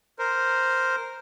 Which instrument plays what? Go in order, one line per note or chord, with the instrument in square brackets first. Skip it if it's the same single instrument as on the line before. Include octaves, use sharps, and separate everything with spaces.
[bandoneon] A#4 C5